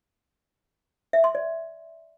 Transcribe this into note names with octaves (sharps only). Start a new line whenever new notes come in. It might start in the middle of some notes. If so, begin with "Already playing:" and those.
E5
C6
D5